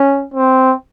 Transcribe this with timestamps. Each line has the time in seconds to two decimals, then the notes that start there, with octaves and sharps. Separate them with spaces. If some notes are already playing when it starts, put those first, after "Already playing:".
Already playing: C#4
0.34 C4